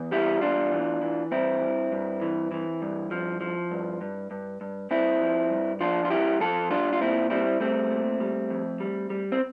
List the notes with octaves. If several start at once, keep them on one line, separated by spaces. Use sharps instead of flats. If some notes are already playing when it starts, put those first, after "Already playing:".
Already playing: E2
G3 E4 G4
E2 D4 F4
E3
E3
G2 C4 E4
G2
G2
E3
E3
G2
F3
F3
G2
G2
G2
G2
G2 C4 E4
F3
G2
F3 D4 F4
F4
G2 E4 G4
F3 F4 A4
G3 D4 F4
F4
A#2 C4 E4
G3 C4 E4
G3 A3 C4
A#2
G3
F2
G3
G3
C4